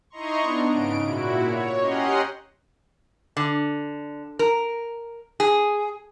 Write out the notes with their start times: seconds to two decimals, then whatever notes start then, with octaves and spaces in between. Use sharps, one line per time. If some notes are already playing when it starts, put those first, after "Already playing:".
0.10 D#4 E4 D#5 A#5 C6 C#6
0.40 B3 D4
0.69 G#2 C#3 D7
1.05 A#2 E4 F#4
1.43 C#5
1.78 C#4 G4 D#5 F#5 A#5 C6
3.37 D3
4.39 A#4
5.40 G#4